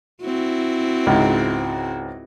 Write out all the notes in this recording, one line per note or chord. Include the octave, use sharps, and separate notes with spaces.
C4 E4 F#4
C#2 G#2